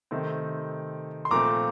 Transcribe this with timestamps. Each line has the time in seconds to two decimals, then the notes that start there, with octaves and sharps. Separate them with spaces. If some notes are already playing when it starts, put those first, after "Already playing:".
0.11 C3 D#3 A3 C4
1.25 C6
1.31 A#2 F3 A3 C4 A#5 D6